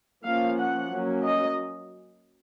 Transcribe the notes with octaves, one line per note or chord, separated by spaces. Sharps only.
F3 A#3 C#4 F5
F#5
F#3 A#3 C#4
D#5